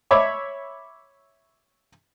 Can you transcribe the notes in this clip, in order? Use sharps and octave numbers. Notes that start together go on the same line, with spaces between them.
C#5 E5 B5 D6